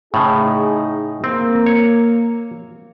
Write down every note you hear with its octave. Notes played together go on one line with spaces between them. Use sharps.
A2 C#3 D#4 G#4
A#3 C4
C#5